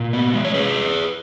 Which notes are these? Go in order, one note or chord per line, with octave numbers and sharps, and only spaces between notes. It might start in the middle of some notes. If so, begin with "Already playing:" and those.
Already playing: A#2
B3
G#3
C#5
C#4 G#4 B4